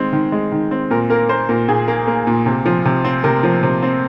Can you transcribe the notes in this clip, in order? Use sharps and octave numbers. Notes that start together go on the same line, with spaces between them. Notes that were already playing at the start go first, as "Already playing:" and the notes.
Already playing: D#3 G#3 C4
D#3
G#3
D#3
C4
A#2 A#4
A#3 A#4
A#3 C5
A#2 A#4
A#2 G#4
A#3
A#3
A#2
C3
F3
C3
C4
C3 A#4
F3
C3
C4